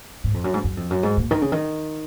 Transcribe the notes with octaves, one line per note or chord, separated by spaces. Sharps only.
G#2
F2
F#2
G#2
F#2
F2
F#2
G#2
A#2
D#3
C#3
D#3